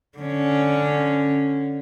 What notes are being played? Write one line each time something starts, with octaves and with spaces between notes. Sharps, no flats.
D3 C#4